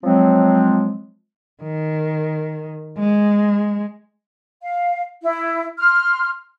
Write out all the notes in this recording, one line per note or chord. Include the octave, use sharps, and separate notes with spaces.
F3 F#3 G#3 C4
D#3
G#3
F5
E4
C6 F6